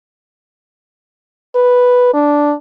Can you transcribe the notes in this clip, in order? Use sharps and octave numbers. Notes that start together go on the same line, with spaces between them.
B4
D4